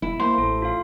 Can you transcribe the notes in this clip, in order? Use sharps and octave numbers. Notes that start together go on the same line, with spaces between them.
E1 E4
A#3 C5
A1 A4
F4 F5